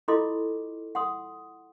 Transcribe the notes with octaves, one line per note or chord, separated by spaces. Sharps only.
E4 F4 A4 D#5 C6 D6
F#5 C6 D#6